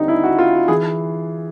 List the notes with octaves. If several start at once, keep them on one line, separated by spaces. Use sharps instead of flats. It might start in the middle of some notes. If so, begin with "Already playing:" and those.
Already playing: D#2 D3 G3 C4 D#4
E4
F#4
F4
F#4
E3 G#4